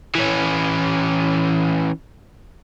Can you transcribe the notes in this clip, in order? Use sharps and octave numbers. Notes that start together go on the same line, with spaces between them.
E3 C#4